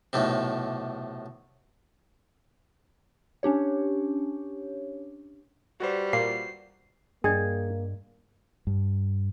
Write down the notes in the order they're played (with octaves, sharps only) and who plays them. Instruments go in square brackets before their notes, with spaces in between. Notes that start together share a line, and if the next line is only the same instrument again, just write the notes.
[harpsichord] B1 A2 C3
[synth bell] C#4 D4 G4 C#5
[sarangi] G3 [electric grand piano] F#4 B4 C5
[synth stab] A#2 [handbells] C7
[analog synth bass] G2 [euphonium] A#3 [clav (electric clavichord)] G#4 [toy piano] D5 D#5 G5
[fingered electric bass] G2